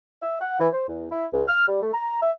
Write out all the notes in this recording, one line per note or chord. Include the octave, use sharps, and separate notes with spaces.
E5
F#5
E3
C5
E2
E4
C#2
F6
G3
A3
A#5
E5